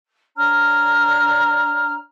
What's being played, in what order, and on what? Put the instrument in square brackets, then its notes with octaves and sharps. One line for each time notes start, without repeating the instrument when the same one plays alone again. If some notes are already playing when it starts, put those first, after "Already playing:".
[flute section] D4 C#5 A#5 F6